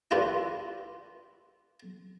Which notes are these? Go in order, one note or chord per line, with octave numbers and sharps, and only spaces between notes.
D4 E4 F4 G4 B4